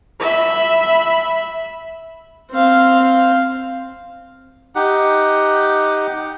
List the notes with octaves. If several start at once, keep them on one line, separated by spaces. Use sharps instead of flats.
E5 B5
C4 F5
D#4 G4 F#5